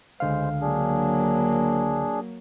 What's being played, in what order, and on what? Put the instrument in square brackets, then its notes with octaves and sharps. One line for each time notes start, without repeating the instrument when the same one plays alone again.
[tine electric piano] C#2 D3 F5 [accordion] G#3 C5
[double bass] F#3 A#3 [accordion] D4 G#4